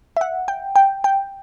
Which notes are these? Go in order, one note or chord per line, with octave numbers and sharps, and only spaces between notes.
E5
F#5
G5
G5
G5